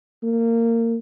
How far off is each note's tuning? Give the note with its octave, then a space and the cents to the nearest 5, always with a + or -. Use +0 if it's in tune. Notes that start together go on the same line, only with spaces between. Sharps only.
A#3 -25